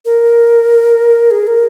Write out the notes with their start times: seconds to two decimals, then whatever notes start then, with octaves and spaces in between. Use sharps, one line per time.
0.05 A#4
1.31 G#4
1.47 A#4